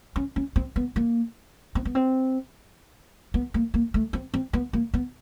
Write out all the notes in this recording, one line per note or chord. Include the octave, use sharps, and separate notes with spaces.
C#4
C#4
C4
B3
A#3
C4
B3
C4
B3
A#3
A#3
A3
C4
C4
B3
A#3
B3